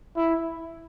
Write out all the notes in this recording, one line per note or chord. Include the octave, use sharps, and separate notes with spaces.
E4